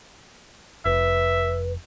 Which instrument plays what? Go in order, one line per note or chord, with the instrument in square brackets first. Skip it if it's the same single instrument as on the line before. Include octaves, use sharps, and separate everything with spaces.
[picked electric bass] F1 [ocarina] B4 [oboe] E5